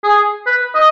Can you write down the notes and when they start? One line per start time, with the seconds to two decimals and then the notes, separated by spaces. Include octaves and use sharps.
0.03 G#4
0.46 B4
0.75 D#5